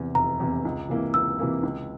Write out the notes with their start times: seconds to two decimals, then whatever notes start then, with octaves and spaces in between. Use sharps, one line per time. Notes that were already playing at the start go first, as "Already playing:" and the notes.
Already playing: E2 C3
0.15 F1 A#5
0.40 E2 C3
0.65 C#2
0.89 C3 E3 A#3 E4
1.14 C#2 E6
1.39 C3 E3 A#3 E4
1.63 C#2